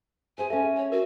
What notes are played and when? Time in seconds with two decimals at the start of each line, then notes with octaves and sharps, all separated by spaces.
0.38 G#4 C5 E5 G#5
0.50 C#4 A4 E5 F5
0.77 C#5
0.92 F#4 A#4